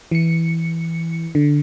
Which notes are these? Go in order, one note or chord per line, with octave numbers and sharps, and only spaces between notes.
E3 C#7
D3